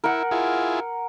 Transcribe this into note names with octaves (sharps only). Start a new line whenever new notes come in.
E4 A#4 F#5
E4 F4 G#4